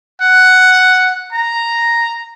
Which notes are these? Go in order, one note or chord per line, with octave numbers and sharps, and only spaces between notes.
F#5
A#5